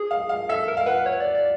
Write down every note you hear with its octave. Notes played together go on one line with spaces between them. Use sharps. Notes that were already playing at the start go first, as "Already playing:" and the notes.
Already playing: G#4
F5
F5
A4 E5
A#4
F5
B4 F#5
C#5
D5
D5